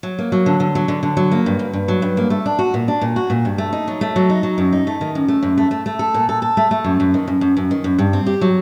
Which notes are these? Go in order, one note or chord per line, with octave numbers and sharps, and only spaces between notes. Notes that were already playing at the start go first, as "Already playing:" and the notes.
F#3
A#3
F#3
D3
D3
F#3
D3
D3
F#3
A#3
G2
G2
G2
F#3
G2
A#3
A3
D4
F#4
A#2
D4
A#2
F#4
A#2
G2
A3
D#4
F#3
A3
F#3
D#4
F#3
F#2
D#4
A3
D#3
F#2
A3
F#2
A3
A3
A3
A4
A#2
A4
A4
A3
A3
F#2
F#2
D#3
F#2
F#2
F#2
D#3
F#2
G2
C4
G4
F#3